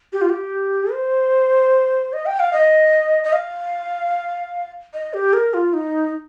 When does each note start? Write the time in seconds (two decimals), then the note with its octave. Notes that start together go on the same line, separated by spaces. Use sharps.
0.13 G4
0.21 F4
0.30 G4
0.92 C5
2.13 D#5
2.26 G5
2.40 F5
2.53 D#5
3.24 D#5
3.33 F5
4.93 D#5
5.14 G4
5.33 A#4
5.54 F4
5.74 D#4